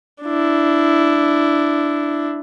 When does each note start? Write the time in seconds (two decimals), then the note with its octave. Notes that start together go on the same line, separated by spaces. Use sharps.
0.24 D4 E4